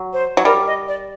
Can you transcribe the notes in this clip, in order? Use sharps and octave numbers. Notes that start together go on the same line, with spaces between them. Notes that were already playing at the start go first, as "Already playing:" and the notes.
Already playing: F#3
C5
F#3
G3 A#4
D#5
D5